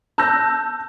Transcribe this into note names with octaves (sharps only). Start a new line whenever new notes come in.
A5 E6 F#6 G6 A#6